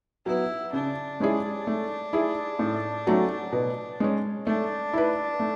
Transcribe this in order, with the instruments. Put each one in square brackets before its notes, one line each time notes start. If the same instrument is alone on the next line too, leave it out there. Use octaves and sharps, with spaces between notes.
[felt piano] F#3 B3 [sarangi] E4
[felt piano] C#3 [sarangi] D4
[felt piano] G#3 C#4 E4 G#4
A3
E4 G#4
A2
F#3 A3 C#4
B2
G#3 C#4
[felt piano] A3 [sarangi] D4
[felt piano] E4 B4
A3